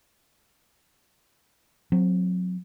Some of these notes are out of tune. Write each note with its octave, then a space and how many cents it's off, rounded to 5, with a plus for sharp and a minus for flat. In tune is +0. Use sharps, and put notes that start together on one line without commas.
F#3 -25 C4 +0